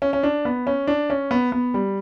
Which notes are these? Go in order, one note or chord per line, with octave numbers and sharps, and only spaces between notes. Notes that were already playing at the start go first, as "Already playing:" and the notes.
C#4
C#4
D4
B3
C#4
D4
C#4
B3
B3
G3